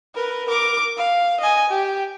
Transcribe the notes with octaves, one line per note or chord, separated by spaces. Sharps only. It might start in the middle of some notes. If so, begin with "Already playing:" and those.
A#4 B4
A#4 D6
F5
D#5 G#5
G4